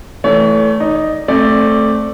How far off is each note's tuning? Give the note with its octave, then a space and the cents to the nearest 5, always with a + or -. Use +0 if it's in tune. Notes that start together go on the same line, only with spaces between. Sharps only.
E3 +5 A3 +0 C#5 +40
D#4 +0 D5 +5
A3 +0 C4 +20 D5 +0